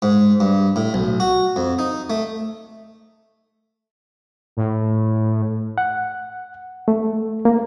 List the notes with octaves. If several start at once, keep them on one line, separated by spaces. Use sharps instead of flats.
G#2
G2
A2
B1
F#4
F2
D#4
A3
A2
F#5
A3
A#3